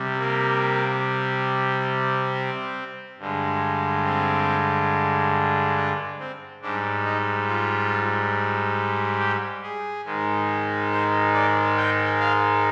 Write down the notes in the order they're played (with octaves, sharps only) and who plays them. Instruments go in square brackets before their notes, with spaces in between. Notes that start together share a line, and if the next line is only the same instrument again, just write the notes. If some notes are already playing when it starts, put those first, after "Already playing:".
Already playing: [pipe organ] C3 G3
A#3
C4
G2 D3 G#3
C4
D4
C4
G#2 G3 D4
D#4
F4
G4
G#4
G#2 D#3 G#3
C5
D5
G5
F5